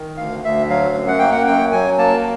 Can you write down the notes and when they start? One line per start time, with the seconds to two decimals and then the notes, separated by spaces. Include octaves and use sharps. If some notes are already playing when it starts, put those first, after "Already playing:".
Already playing: D#3
0.17 D2 F5
0.44 D2 E5
0.69 F#3 F5
0.95 F#2
1.08 F#5
1.19 A#3 G5
1.32 F#5
1.47 F#2 G5
1.72 F#3 G#5
1.98 A#3 A5